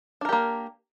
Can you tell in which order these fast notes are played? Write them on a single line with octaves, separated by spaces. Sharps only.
D4 A#4 G4 A#3